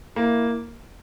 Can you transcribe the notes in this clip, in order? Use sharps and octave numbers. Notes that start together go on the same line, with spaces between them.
A#3 E4